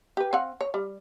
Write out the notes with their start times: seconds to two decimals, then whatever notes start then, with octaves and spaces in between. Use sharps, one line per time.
0.17 G4 B4
0.33 C4 F5 F#5
0.61 C#5
0.74 G3